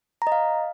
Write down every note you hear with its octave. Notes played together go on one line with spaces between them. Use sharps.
A#5
D#5
F5